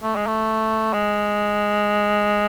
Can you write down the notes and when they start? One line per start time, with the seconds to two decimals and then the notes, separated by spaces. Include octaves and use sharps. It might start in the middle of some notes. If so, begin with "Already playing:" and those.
0.03 A3
0.15 G#3
0.27 A3
0.93 G#3